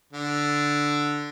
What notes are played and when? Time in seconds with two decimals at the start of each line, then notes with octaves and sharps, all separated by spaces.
0.13 D3